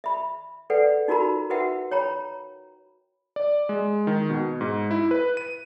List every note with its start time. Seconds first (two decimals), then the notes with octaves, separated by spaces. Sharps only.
0.04 E5 B5
0.70 A4 B4 D5 F#5 G5
1.08 D#4 F4 F#4 A#4 A#5 B5
1.50 F#4 A#4 B4 E5 F#5 G5
1.91 C#5 G5 A#5 B5
3.36 D5
3.69 G#3
4.07 D#3
4.30 B2
4.61 G#2
4.91 E4
5.11 B4
5.37 D#7